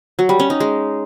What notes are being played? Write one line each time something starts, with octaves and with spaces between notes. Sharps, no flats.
F#3
G3
C#4
D#4
G#3